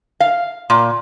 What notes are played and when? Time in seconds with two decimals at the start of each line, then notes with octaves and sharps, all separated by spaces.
0.20 F5
0.70 A#2